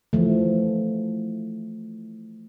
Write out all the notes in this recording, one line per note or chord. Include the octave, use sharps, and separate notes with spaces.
E3 F3 A3